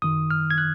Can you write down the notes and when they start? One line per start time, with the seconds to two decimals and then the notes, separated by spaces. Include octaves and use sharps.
0.02 G#1 F#2 D#3 D#6
0.31 F6
0.51 G#6
0.58 F#6